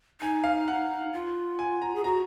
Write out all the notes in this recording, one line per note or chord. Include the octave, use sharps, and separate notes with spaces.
D#4 G#5
F5
F#5
F4
G#5
A#5
G#4
F#4 A#5